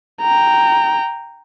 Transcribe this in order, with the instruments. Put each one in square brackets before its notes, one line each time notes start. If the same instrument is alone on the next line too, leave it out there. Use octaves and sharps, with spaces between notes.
[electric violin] G5 A#5